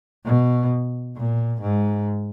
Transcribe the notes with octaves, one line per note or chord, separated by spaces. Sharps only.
B2
A#2
G#2